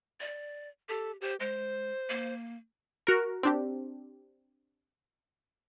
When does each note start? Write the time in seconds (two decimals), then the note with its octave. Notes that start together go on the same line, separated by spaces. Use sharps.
0.21 D5
0.89 G4 A4
1.21 G4 C5
1.40 G#3 C5
2.10 A#3
3.07 F#4 A#4
3.43 C4 D4 G4